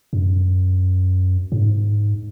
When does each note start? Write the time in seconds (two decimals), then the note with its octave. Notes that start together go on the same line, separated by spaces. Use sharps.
0.13 F#2
1.52 G#2